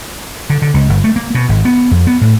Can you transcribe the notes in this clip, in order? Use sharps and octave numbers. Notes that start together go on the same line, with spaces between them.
D3
D3
C#2
G1
A3
A#3
B2
G#1
B3
F2
B3
A2